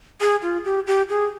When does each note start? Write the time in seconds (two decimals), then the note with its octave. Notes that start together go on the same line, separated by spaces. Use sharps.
0.20 G#4
0.42 F4
0.65 G4
0.87 G4
1.09 G#4